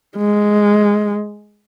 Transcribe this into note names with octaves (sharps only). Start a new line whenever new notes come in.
G#3